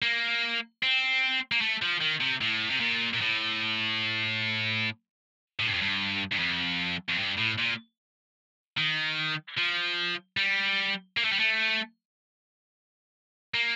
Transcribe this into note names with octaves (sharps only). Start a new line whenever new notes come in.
A#3
C4
A#3
A3
F3
D#3
C3
A2
C3
A#2
A#2
A2
A2
G2
F2
G2
G2
F2
F2
G2
A2
A#2
D#3
F3
G3
A#3
A3
G3
A3
A#3